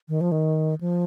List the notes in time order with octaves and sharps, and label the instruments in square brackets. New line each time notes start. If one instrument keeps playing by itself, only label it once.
[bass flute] D#3
F3
D#3
F3